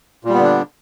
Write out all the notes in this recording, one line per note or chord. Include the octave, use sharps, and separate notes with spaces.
A#2 D3 G3 B3 D4